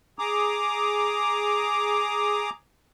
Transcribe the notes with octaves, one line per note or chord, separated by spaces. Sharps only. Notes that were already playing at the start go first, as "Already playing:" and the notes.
G#4 A#5 D6 D#6